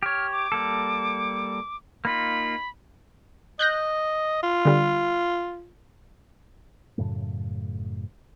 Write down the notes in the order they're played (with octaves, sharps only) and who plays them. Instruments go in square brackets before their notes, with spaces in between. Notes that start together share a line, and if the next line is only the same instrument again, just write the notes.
[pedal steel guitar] G4 C#5 [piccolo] F6
[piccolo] D6
[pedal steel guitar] G3 A#3 A4
[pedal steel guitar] A#3 D#4 F4 [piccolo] B5
[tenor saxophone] D#5 [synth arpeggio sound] F#6 G6 A#6
[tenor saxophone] F4
[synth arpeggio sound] D3 G3
[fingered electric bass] F#2 A2 C#3 A3